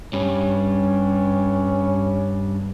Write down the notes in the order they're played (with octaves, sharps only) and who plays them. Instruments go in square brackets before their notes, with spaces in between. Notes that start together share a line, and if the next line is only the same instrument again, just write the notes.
[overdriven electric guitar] G2 [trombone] C#4